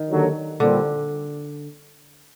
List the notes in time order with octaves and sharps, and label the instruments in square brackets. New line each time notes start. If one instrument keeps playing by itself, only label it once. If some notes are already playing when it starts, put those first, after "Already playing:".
Already playing: [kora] D#3
[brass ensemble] D#2 D3 F#3
[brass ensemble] A#2 G3 C4 [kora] D3